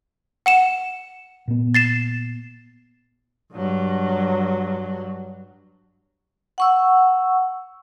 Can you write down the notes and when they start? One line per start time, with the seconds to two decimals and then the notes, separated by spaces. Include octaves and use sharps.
0.46 F#5 C#7 E7
1.48 A#2 B3
1.74 A6 C7 E7
3.53 G2 F#3
6.58 F#5 C#6 E6